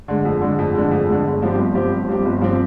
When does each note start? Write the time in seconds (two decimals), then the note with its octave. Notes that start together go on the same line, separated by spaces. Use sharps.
0.08 D3 G#3
0.25 F2
0.41 D3 G#3
0.59 F2
0.75 D3 G#3
0.91 F2
1.09 D3 G#3
1.24 G1
1.42 G2 F3 C4 G4
1.58 G1
1.74 G2 F3 C4 G4
1.92 G1
2.09 G2 F3 C4 G4
2.25 G1
2.41 G2 F3 C4 G4